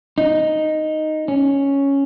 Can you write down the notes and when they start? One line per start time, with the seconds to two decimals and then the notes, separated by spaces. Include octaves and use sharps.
0.18 D#4
1.28 C#4